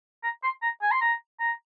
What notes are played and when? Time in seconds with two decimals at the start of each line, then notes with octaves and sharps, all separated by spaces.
0.23 A#5
0.44 C6
0.62 A#5
0.82 G#5
0.92 C6
1.01 A#5
1.39 A#5